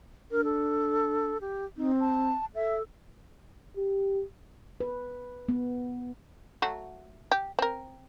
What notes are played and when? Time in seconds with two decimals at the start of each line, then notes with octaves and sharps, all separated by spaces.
0.31 D4 A#4
0.44 A4
1.41 G4
1.77 C4 D#4
2.00 A5
2.55 A4 E5
3.77 G4
4.80 B4
5.49 B3
6.62 F#3 A3 F#4
7.32 G4
7.59 C4 A#4